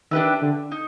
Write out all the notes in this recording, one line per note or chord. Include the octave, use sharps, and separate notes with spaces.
D#3 D4 G4 B4 E5
D3
D#4